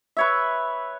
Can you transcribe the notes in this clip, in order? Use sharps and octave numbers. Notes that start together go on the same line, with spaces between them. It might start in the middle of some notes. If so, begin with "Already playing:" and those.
B4 C#5 E5